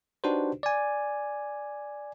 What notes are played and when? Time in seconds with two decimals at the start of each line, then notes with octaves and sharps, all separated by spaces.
0.24 D4 D#4 F#4 G4 B4 C5
0.63 D5 G#5